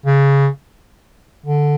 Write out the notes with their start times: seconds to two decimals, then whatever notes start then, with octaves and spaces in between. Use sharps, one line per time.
0.06 C#3
1.46 D3